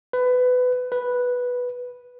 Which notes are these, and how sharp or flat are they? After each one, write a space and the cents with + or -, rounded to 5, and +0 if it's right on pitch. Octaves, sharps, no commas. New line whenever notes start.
B4 +20
B4 -5